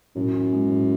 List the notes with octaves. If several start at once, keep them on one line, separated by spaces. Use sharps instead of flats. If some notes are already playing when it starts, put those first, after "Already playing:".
F#2 A2
E3
G#3
A2